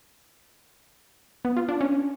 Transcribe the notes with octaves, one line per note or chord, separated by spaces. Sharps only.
B3
F4
D4
C#4